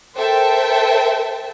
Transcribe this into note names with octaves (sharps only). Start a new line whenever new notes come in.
A4 A#4 C5 E5 G5 A5